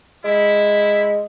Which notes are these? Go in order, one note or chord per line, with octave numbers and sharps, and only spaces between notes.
G#3 E4